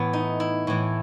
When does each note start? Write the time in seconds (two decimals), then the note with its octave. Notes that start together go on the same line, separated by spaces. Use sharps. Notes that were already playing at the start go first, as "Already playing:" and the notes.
Already playing: A2 E3 B3
0.13 D#4
0.40 E4
0.67 A2 E3